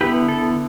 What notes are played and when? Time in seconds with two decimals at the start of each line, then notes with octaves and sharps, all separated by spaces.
0.01 D3 B3 E4 G4 B4
0.28 A4